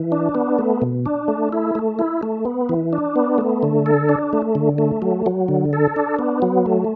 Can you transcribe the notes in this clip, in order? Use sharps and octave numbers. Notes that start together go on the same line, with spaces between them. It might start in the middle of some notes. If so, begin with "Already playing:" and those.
Already playing: E3
D4
B3
A3
B2
D4
A3
E4
A3
E4
A3
B3
E3
D4
B3
A3
D3
A4
D4
A3
D3
A3
F#3
F#3
D3
A4
D4
B3
F#3
A3